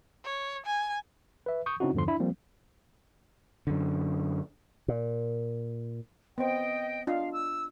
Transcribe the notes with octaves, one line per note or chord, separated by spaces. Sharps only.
C#5
G#5
B4 E5
C#6 D#6 G6
C#3 C4 C#4 D#4 E4 F#4
E2 G2 D3 F3 C6
D4 E4 B5
F3 G3 A#3 C4
F#2 D3
A#2
B3 C4 C5 D#5 G5
D4 F4 D#5 F5
E6